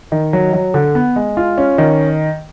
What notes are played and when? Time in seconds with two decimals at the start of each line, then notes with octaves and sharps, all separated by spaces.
0.12 D#3
0.33 F#3
0.53 F#3
0.74 D3
0.95 B3
1.16 G#3
1.37 F4
1.58 C#4
1.78 D#3